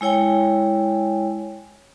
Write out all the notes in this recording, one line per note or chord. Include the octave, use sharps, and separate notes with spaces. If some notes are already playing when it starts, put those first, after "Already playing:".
G#3 E4 C#5 G5 G#5